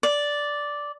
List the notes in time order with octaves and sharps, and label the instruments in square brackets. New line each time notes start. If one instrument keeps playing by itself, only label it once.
[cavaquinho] D5